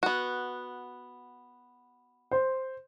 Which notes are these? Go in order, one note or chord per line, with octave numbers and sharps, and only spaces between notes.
B3 F#4
C5